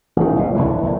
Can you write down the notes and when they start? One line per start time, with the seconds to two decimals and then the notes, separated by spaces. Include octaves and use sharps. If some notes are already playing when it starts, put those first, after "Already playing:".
0.16 A1 D#3
0.37 F#1 C#2 B2
0.55 G#1 D2 D3 E3
0.82 A#1 A2